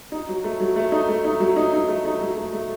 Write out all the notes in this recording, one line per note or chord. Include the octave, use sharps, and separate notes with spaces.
D#4
F#3
A3
F#3
A3
D#4
A3
D#4
F#3
D#4
D#4
A3
D#4
F#3
A3
A3